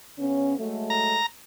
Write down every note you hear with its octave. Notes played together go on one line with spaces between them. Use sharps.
C#3 B3 C#4
F#3 G#3 A3
A#5